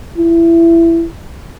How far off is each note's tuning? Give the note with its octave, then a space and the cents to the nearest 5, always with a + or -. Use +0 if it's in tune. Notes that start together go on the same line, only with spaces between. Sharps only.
E4 +20